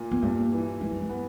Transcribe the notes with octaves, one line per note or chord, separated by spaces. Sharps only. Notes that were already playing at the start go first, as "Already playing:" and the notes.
Already playing: A#2
B3
G2 A#3
E3
E3 G#3
G3
G#3
B3